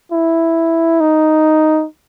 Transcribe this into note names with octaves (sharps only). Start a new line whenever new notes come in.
E4
D#4